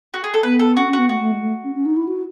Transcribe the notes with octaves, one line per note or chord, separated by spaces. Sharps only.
F#4
G#4
A4
B3 B4
A4
C#4 F#4
C#4
F#4
B3
A3 F#4
A3
G#3
A3
C#4
C#4
D#4
E4
F#4